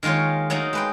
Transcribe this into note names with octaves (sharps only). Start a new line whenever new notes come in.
D#3 G#3 A#3 F4 C#5
F#3 A3 A#3 D#4
G#3 B4 G5